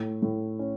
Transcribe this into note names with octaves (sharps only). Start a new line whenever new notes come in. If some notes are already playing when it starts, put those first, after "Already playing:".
Already playing: A2
A2
C#4